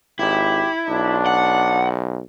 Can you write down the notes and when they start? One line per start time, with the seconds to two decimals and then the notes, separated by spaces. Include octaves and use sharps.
0.19 G#1 E4 G4
0.88 B1 D4
1.26 F#5